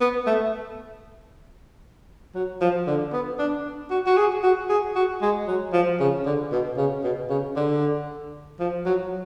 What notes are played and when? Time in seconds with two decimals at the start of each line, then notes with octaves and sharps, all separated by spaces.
0.01 B3
0.26 A3
2.35 F#3
2.61 F3
2.87 D3
3.13 B3
3.39 D4
3.90 F#4
4.06 F#4
4.17 G#4
4.43 F#4
4.69 G#4
4.95 F#4
5.22 G#3
5.48 F#3
5.73 F3
6.00 C#3
6.26 D3
6.52 B2
6.77 C#3
7.03 B2
7.29 C#3
7.56 D3
8.60 F3
8.86 F#3